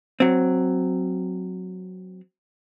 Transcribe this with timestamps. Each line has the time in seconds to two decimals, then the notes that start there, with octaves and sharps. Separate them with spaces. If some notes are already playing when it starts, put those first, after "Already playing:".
0.20 F#3 C4